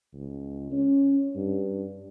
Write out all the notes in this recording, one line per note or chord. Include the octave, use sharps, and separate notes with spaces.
C#2
C#4
G2